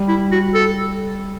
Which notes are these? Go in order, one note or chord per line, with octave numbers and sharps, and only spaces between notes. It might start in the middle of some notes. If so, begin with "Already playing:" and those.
Already playing: G3
E4
F#4
A4